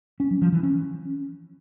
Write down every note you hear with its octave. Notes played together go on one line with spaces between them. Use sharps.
C#4
F#3
F3
E3
C#4